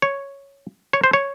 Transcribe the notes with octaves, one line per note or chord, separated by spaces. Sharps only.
C#5
C#5
C5
C#5